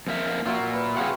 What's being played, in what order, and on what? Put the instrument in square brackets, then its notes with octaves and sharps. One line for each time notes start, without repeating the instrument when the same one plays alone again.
[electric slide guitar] F2 A#3 E5
[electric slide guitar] A#2 A#3 F4 [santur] F#3 C5 E5
[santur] B4
[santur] F#3 C4 C5 [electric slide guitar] G#4 F5 F#5